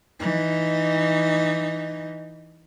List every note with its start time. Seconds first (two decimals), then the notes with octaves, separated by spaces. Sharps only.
0.20 E3 D#4